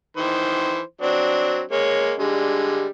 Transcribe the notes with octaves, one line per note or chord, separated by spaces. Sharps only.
D#3 E3 C5
F#3 C4 D4
G#3 A#3 C#5
D3 G3 G#3